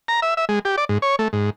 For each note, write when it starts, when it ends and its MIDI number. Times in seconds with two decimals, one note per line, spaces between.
0.08 0.20 82
0.22 0.34 76
0.37 0.45 76
0.49 0.59 56
0.65 0.76 67
0.78 0.85 74
0.89 0.98 44
1.02 1.16 73
1.19 1.28 57
1.33 1.50 44